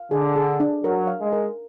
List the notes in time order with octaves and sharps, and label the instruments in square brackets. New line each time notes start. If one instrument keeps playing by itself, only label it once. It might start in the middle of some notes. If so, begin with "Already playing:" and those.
Already playing: [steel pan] F5
[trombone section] D3 [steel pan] G#4
[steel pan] G#4
D4
[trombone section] F#3 [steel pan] A#4
[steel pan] F5
[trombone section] G#3
[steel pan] A#4